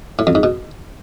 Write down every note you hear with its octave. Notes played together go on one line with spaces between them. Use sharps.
A2
F2
G#2
B2